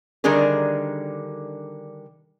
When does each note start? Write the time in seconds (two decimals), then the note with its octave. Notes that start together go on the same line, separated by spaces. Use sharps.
0.24 D3 D#3 G3 D4 G#4 A#4